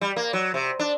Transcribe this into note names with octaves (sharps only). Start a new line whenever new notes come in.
G3
A#3
F#3
C3
D4